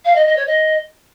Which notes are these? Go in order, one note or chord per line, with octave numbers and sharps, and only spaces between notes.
F5
D#5
D#5
C#5
D#5